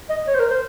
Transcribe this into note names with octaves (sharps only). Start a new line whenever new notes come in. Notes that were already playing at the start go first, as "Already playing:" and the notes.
D#5
C#5
C5
A#4
C5